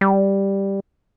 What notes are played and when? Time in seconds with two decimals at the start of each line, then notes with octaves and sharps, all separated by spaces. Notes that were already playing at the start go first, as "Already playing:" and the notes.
0.01 G3